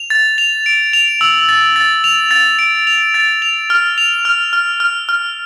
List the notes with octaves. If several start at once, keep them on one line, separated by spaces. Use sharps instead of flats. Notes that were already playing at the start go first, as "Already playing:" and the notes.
Already playing: F7
A6
F7
D7
F7
E6
A6
A6
F7
A6
D7
F7
A6
F7
F6
F7
F6
F6
F6
F6